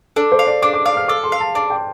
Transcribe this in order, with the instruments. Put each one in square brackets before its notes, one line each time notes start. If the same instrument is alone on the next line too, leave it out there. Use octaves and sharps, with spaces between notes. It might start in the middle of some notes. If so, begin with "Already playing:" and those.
[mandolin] D4 [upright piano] A4
[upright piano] C5
[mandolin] F5
[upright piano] D5
[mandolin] D4 [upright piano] D6
[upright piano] D6
[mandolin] F5 [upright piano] D6
[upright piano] F6
[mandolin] A4 [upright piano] D6
[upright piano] C6
[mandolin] F5
[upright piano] A5
[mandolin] D4 [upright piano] A5
[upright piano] G5